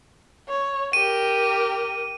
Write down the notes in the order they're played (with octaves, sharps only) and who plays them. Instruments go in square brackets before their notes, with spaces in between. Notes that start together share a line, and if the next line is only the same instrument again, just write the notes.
[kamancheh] C#5
[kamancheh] G4 A#4 [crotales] D#7